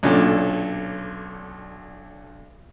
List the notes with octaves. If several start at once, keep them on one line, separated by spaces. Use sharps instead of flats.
B1 A#2 D3 C#4 A4